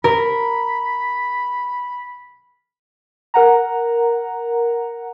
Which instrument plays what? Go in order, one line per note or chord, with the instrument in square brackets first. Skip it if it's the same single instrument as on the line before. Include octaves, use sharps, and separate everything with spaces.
[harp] A#4 [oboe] B5
[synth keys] A#4 F#5 A#5